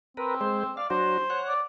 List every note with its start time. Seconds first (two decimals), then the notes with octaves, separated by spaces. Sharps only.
0.17 C4 A#4 B4
0.41 G#3 C5
0.77 D5 F5
0.90 F#3 D4 F#4 C5
1.30 C#5 F#5
1.48 D5